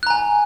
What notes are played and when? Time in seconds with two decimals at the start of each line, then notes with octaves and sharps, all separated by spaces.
0.03 F#6
0.07 A#5
0.10 G#5